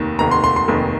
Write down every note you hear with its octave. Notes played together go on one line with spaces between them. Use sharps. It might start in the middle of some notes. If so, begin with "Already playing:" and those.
Already playing: F1 D#2 D#3
F1 D#2 D#3 A#5
C6
C6
C6
F1 D#2 D#3